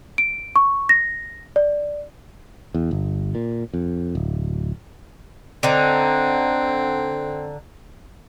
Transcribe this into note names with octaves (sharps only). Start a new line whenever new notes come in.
D7
C#6
A#6
D5
E2
G1
A#2
F2
D1
D3 C4 D#4